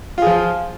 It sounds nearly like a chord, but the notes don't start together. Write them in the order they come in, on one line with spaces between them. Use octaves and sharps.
F4 G#4 F3